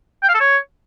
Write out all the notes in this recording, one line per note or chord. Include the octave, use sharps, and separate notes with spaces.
G5
F5
A4
C#5